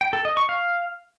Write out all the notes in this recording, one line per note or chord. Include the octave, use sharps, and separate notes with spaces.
G5
A4
D#5
C#6
F5